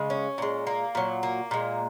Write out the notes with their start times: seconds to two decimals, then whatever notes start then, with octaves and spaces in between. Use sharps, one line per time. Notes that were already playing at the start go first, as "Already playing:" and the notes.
Already playing: C#3 G#3
0.10 C#4
0.38 A#2 G#3
0.67 A#3
0.95 A#2 F#3
1.23 A#3
1.51 A#2 G#3